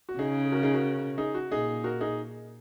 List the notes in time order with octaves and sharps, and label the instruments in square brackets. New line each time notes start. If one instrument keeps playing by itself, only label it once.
[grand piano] F#4
[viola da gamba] C#3 [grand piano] D#4 G#4
[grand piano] G#4
F#4 A#4
D#4 G#4
F#4 A#4
D#4 G#4
F#4
[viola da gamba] A#2 [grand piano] D#4 G#4
[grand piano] F#4 A#4
D#4 G#4